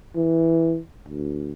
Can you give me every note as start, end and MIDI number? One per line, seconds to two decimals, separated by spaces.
0.16 0.78 52
1.08 1.51 38